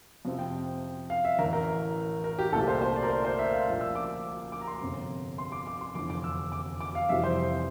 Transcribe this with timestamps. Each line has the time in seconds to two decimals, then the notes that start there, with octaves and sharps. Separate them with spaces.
0.25 F2 C3 F3 C4
0.39 G5
1.10 F5
1.25 E5
1.39 A1 A2 E3 A#4
1.53 A#4
2.24 A#4
2.39 G4
2.52 C2 A#2 A3 C4 A4
2.68 C5
2.82 C5
2.96 D5
3.03 A#4
3.10 C5
3.25 C5
3.39 E5
3.53 F5
3.67 A#1 A#2 F3 A#3
3.81 E6
3.95 D6
4.52 D6
4.61 A#5
4.67 C6
4.81 G1 F2 C3
5.38 C6
5.52 D6
5.67 D6
5.81 C6
5.95 F1 E2 D3 F3 D6
6.10 D6
6.24 E6
6.52 D6
6.81 D6
6.95 F5
7.09 F1 F2 C3 E3 G3 E5
7.24 C5